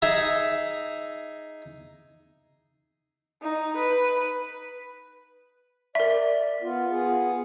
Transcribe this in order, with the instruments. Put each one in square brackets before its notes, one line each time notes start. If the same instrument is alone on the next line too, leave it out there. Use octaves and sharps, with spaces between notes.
[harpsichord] D#4 G#4 E5 A#5
[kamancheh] D#4
B4
[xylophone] A#4 E5 [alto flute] D5
[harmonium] B3 [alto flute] F4
[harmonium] B3 G#4